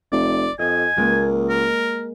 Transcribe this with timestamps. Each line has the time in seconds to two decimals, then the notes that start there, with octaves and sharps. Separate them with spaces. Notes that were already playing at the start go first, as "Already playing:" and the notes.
0.12 F1 D5
0.59 F2 D#5 G#5
0.97 C#2 G#3 A#3
1.49 A#4